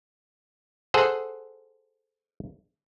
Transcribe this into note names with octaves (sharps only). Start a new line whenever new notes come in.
G#4 A4 C5 F#5